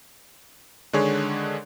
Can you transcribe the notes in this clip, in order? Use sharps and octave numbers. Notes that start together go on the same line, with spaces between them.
D3 D#3 G#3 D4 G#4 C#5